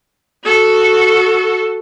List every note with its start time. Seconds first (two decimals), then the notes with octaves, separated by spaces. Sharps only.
0.45 F#4 A4